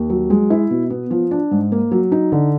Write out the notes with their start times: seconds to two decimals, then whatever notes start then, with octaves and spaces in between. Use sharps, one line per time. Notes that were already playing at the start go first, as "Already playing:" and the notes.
Already playing: D#2
0.10 F#3
0.30 G#3
0.50 E4
0.71 B2
0.90 B3
1.11 F3
1.31 D4
1.51 G#2
1.72 A#3
1.91 F#3
2.12 D#4
2.32 D3